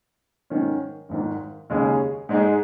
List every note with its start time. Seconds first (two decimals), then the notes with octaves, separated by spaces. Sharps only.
0.50 G#2 D#3 C#4
1.09 G#1 G#2 D#3
1.70 D#2 C#3 G#3 C#4 G#4
2.29 G#2 G#3 D#4 G#4